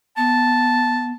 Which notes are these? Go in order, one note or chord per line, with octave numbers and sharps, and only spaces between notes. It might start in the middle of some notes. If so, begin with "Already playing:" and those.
B3 A5